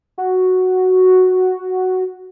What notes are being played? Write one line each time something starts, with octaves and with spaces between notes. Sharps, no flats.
F#4